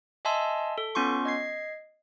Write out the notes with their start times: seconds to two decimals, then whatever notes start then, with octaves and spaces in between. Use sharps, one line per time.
0.25 D#5 E5 G#5 A5 C6 E6
0.78 A4
0.95 B3 C#4 F4 C6 C#6
1.25 D#5 G#6 C7